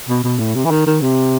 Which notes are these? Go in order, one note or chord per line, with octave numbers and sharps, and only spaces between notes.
B2
B2
A2
C3
E3
D#3
D#3
C3